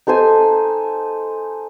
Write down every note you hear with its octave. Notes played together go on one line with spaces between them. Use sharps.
D#4 A4 C5 G#5